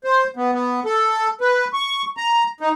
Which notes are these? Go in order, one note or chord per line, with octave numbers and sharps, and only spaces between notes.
C5
B3
B3
A4
B4
C#6
A#5
D#4